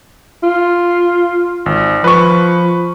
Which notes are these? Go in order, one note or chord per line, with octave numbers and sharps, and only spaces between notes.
F4
G#1
F3 B4 C#6